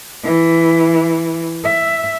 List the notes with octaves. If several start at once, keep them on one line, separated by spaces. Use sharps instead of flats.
E3
E5